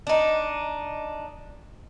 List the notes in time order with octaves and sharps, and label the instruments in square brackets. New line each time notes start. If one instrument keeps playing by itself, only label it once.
[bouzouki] D4 D#4